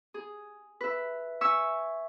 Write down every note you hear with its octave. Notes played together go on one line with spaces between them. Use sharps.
G#4
B4 E5
E5 G#5 C#6 E6